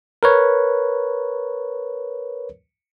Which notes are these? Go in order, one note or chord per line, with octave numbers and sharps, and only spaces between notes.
A#4 B4 C#5